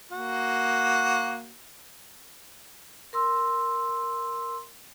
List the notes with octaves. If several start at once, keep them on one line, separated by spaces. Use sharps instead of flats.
A#3 F#4
A#4 C6 E6